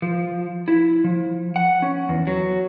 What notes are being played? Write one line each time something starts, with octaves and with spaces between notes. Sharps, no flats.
F3
E4
F3
F#5
C#4
E2
F#3